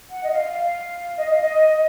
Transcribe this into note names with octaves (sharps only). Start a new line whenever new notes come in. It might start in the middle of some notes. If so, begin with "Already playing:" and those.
F#5
D#5
F5
F5
D#5
F5
D#5